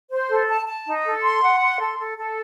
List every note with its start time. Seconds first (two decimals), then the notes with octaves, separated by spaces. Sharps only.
0.11 C5
0.30 A4
0.49 A5
0.67 A5
0.86 D#4
1.05 A4
1.23 C6
1.42 F#5
1.61 C6
1.80 A4
1.99 A4
2.17 A4